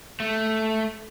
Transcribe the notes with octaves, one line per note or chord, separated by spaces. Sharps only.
A3